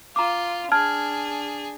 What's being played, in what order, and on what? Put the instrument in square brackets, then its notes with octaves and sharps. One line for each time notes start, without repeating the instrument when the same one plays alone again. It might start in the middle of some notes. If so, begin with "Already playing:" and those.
[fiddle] F4 [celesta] A#5 D6
[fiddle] D4 G#4 [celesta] A5 F6 G#6